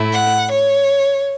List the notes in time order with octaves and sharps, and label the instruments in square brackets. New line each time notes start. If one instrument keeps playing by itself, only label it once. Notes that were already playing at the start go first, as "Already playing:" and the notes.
Already playing: [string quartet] A2 A3 E4
F#5
C#5